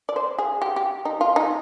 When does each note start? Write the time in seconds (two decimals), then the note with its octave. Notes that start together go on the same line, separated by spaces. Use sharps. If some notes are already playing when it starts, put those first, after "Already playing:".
0.09 D5
0.16 C5
0.38 G#4
0.62 G4
0.76 G4
1.05 D#4
1.21 F4
1.36 D#4